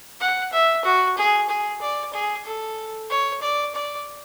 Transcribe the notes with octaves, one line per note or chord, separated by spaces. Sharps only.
F#5
E5
F#4
G#4
G#4
D5
G#4
A4
C#5
D5
D5